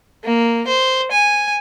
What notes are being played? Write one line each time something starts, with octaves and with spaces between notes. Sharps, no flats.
A#3
C5
G#5